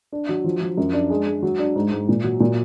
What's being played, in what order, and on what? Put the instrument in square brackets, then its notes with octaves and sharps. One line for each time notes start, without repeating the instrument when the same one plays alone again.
[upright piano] D4
F#3
F3
F3
F#2
D4
G#3
G#3
F#3
D4
G#2
G#2
A#2
F#3
A#2